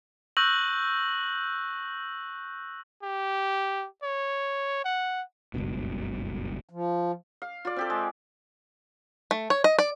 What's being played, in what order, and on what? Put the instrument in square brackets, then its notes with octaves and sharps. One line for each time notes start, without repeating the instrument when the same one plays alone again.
[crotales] C#6 E6 F#6 G6 A#6 F#7
[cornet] G4
C#5
F#5
[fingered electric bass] F#1 C#2 G2 B2
[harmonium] F3
[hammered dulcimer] F5
F4 D5
C4 G4 A4
G#3
[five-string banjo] A3
C#5
D#5
D5